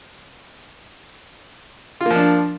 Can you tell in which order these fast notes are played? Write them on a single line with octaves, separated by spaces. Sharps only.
F4 A#3 F3 D4